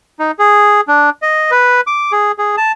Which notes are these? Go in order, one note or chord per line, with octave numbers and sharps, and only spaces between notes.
D#4
G#4
D4
D#5
B4
D6
G#4
G#4
A5